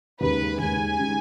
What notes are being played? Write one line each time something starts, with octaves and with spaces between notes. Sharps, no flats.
D#2 C#3 G#3 D#4 G4 B4
D#2 C#3 G#3 D#4 G4 G#5
C#3 G#3 D#4 G4